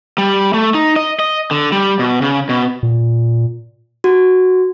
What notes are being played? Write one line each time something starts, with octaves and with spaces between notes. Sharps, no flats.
G3
A3
D#4
D#5
D#5
D3
G3
B2
C#3
B2
A#2
F#4